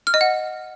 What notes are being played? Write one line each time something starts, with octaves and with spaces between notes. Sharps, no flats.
F6
D#5
F#5